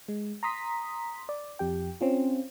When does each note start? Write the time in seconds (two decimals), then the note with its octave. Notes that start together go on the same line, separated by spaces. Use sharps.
0.08 G#3
0.43 A#5 C6 D#6 B6
1.29 D5
1.59 F2 G4 G5
2.01 C4 C#4 F4